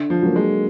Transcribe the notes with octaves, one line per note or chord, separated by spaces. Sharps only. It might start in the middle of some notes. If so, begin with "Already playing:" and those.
Already playing: D3
F3
F#3 A#3
G#3